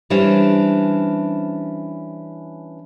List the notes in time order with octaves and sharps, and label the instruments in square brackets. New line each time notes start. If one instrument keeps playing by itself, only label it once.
[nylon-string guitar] E3 G3 C#4 D4 C5